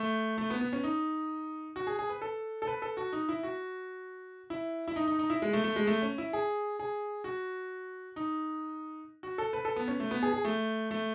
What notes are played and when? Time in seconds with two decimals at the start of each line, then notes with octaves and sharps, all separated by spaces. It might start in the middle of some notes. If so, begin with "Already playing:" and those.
Already playing: A3
0.38 A3
0.50 B3
0.61 B3
0.73 C#4
0.84 D#4
1.76 F#4
1.87 G#4
1.99 G#4
2.09 B4
2.22 A4
2.62 A4
2.67 B4
2.82 A4
2.97 F#4
3.12 D#4
3.29 E4
3.43 F#4
4.50 E4
4.88 E4
4.96 D#4
5.07 D#4
5.19 D#4
5.30 E4
5.42 G#3
5.53 A3
5.64 A3
5.76 G#3
5.87 A3
6.02 C#4
6.18 E4
6.33 G#4
6.79 G#4
7.24 F#4
8.16 D#4
9.23 F#4
9.38 A4
9.53 B4
9.65 A4
9.76 B3
9.88 C#4
10.00 A3
10.11 B3
10.23 G#4
10.33 G#4
10.45 A3
10.91 A3